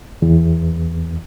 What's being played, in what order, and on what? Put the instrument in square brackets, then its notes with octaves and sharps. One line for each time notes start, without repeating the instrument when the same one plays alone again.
[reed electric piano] E2